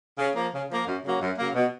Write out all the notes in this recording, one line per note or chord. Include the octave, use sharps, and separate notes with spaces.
C#3
F3 A#3
C#3
F3 A#3
F#2
C#3 F#3 A#3
F#2
C#3 F#3 A#3
B2